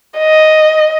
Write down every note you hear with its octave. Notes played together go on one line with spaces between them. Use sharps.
D#5